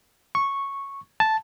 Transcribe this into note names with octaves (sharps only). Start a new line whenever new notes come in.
C#6
A5